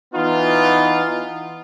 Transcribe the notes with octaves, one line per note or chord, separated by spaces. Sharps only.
E3 B3 D#4 F4